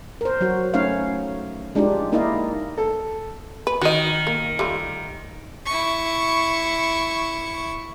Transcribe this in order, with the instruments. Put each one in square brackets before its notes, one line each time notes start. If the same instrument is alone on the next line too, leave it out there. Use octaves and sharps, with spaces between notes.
[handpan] A#4 C5
F#3 F#4
A3 C#4 D#4 C#5 F5
G#3 D4 D#4 F4 G4
A#3 D#4 E4 D5 D#5 F5
[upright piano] A4
[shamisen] B4
[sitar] D#3 [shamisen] F#4 D#5
[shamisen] A#3
G3 A3 F4
[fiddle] E4 C#6